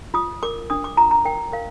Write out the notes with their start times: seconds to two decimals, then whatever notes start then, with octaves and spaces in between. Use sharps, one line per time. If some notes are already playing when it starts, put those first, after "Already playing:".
0.14 F4 D#6
0.43 A#4 D6
0.70 D4 D#6
0.84 D6
0.97 F4 A#5
1.11 A#5
1.25 A#4 G5
1.52 A#4 F5